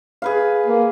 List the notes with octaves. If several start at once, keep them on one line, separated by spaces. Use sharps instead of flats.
G#4 B4 F5
A#3